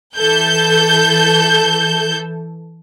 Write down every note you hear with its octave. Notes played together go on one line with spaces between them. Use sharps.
E3 A4 G6